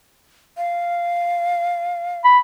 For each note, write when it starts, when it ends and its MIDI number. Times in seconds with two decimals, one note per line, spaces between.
0.57 2.20 77
2.24 2.39 83